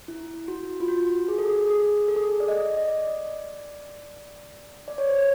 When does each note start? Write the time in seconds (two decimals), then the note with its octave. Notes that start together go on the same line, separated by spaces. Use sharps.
0.08 E4
0.48 F#4
0.80 F4
0.88 F#4
1.28 G#4
1.39 A4
1.48 G#4
1.68 G#4
2.08 A4
2.16 G#4
2.24 A4
2.40 D5
2.48 D#5
2.77 D#5
2.88 D5
4.88 D5
4.98 C#5
5.08 C5
5.19 C#5